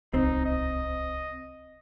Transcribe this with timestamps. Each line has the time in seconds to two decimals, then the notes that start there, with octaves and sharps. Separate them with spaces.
0.14 D1 C2 C4 D#4
0.45 D#5